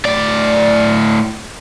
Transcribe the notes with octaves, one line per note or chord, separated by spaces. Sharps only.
A2 D5